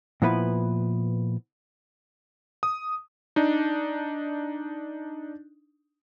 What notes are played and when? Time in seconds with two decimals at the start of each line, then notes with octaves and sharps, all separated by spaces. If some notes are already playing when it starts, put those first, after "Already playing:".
0.22 A#2 F3 B3 E4 B4
2.63 D#6
3.36 D4 D#4